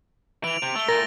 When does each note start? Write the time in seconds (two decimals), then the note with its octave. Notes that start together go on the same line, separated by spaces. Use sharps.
0.44 E3 D7 F7
0.63 C3
0.75 A3 E6 G7
0.89 A#2 A3 A#4 A6 A#6